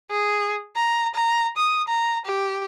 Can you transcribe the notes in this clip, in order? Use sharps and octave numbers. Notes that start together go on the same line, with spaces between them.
G#4
A#5
A#5
D#6
A#5
G4